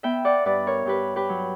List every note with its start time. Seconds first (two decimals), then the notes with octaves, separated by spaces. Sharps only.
0.03 B3 E5 G5
0.25 D5 F#5
0.45 G2 B4 D5
0.67 A#4 C#5
0.85 G2 G4 B4
1.16 G4 B4
1.29 F#3